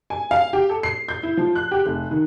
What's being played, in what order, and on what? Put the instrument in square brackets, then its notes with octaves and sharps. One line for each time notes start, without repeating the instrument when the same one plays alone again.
[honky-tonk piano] G#5
F5
G4
A4
C7
G6
E4
F3
F#6
G4
F1
D#3